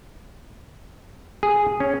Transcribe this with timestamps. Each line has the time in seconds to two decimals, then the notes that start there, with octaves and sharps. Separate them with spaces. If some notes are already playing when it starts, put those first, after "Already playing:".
1.43 G#4
1.80 C#4